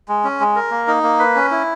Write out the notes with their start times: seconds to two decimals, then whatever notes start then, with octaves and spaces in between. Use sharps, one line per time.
0.09 G#3
0.24 C#4
0.40 G#3
0.56 A#4
0.71 A#3
0.88 D#4
1.03 A#3
1.19 B4
1.36 C#4
1.51 E4